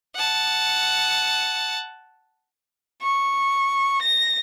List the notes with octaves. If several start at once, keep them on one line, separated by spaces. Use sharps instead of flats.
F#5 A5
C#6
A#6